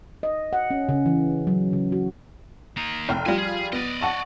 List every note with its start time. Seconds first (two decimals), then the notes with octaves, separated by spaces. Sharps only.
0.23 D#5
0.53 F#5
0.71 C#4
0.89 C#3
1.06 E3
1.47 F#3
1.73 C#3
1.92 F#4
2.77 A#3 D#4
3.09 F1 G5 F6
3.26 F3 G3 F4 D#5 G#5
3.38 G#4
3.73 B3 D5 D#5
4.01 F#5 A5 C#6